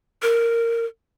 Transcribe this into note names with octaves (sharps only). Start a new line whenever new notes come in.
A#4